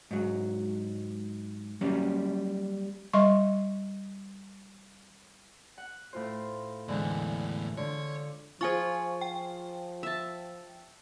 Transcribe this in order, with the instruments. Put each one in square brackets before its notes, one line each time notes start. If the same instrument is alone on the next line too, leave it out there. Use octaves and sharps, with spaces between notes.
[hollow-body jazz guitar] G#2 F#3
F#3 G3 A#3 C#4
[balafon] G3 D#5 C6 C#6
[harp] F#5
A2 F4 C5
[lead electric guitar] E2 A2 [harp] D3 E3 G#3
[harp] D3 F4 [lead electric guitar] C#5
[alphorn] F3 [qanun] F4 G#4 [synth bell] C5 G#5 C#6
[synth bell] G5
[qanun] E5 A5